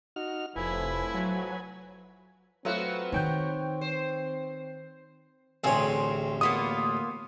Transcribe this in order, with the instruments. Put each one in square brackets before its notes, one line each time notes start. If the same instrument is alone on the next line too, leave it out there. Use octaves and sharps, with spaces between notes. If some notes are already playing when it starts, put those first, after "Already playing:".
[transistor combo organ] D#4 F#4 F6
[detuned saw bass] F1 [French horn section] A2 F3 [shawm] E4 [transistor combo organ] B4 G#5
[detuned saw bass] F#3
[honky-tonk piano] F#3 A3 F4 [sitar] B3 F#4 [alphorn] C4
[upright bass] D#3 D#4 [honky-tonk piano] C#5 G5 G6
[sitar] C5
[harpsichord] A1 D2 C#5 [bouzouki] C4 G#4
[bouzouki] A#3 B3 F4 [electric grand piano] D#6